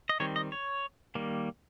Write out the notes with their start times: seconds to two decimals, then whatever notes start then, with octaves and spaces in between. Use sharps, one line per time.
0.09 D#5
0.20 D#3 G3 C4 C#5
0.36 D#5
0.52 C#5
1.15 D#3 G3 A#3